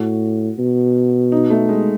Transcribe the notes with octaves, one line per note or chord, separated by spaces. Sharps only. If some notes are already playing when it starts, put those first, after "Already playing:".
Already playing: A2 F#4
B2
D#4
A3
G#3